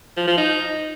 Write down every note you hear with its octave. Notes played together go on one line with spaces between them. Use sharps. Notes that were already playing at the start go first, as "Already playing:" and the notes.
F3
F3
D#4